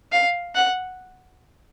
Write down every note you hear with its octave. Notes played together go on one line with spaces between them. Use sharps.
F5
F#5